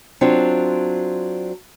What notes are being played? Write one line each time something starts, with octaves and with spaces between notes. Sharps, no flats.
F#3 C4 D4 F4